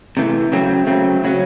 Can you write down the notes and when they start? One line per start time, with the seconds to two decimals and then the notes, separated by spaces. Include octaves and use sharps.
0.17 C3 E3 A3
0.52 C#3 F#3 A3 C4
0.87 C#3 F#3 A3 C4
1.24 C#3 F#3 C#4